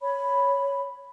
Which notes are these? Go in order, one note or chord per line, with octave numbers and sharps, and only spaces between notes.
C#5 B5